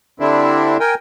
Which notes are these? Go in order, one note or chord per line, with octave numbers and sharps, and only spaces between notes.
D3 G3 C4 D4 E4
A#4 G5 G#5